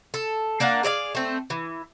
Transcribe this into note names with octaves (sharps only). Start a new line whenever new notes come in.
A4
A#3 D4 F5 F#5
G#4 D5 D#5 F5
A3 C4
E3